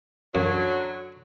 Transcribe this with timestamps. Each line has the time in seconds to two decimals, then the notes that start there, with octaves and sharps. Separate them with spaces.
0.35 F#2 D3 F#3